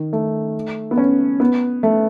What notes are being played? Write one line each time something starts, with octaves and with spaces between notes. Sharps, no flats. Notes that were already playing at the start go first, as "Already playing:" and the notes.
Already playing: D#3
A3
B3
C#4
B3
A3